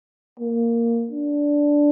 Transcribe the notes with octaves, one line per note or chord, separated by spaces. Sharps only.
A#3
D4